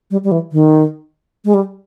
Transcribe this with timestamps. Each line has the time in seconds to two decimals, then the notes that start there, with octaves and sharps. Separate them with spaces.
0.11 G3
0.24 G3
0.32 E3
0.52 D#3
1.45 G#3
1.54 G3